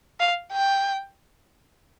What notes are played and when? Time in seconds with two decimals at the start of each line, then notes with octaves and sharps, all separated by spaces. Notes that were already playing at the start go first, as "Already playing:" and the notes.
0.20 F5
0.52 G5